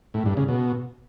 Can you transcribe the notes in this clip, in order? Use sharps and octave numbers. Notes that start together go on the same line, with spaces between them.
A2
G2
C#3
B2